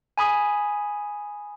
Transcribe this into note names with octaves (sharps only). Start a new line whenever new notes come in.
G#5 B5 D#6